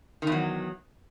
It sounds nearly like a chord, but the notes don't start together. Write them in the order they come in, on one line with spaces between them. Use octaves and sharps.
D#3 E2 F#3